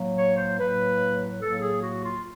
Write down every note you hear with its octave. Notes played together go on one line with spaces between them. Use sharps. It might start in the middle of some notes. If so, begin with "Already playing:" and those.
Already playing: A2 F#3 A#3
C#5
C5
A2 F#3 A#3 B4
A2 F#3 A#3 A4
G#4
F#4
F4